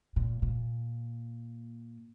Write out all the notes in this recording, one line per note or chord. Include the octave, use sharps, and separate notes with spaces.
A#2
A#2